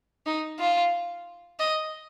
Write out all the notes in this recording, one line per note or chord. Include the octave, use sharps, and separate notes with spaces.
D#4
F4
D#5